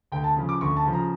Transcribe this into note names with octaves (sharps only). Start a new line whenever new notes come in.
D2 G5
A5
C#3 F3
D6
D2 C#6
A5
C#3 F3
A#5